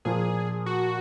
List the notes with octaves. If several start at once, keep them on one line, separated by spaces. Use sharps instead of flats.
A#2 F3 A#3 G#4
F#4